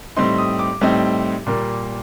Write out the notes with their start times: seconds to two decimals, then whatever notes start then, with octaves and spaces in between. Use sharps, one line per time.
0.16 A2 G3 C4 D#4 C6
0.38 D#6
0.59 D6
0.81 A2 G3 C4 D#4
1.46 A#2 G3 A#3